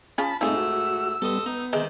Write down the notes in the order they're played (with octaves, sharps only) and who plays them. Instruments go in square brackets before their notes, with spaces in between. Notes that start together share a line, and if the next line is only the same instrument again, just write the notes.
[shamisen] C#4 F4 G#4 [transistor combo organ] A5 B5
[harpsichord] G#2 A3 [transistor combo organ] C4 D#4 [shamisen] F4 G#4 [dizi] E6
[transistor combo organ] F#4
[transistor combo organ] G3 B3 [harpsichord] A4 D#5 C6
[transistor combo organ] B3 [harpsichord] D#4
[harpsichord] C3 D#3 [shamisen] G#3